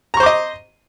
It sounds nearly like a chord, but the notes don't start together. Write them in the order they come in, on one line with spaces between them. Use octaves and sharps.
A#5 C#6 C5 D6 D#5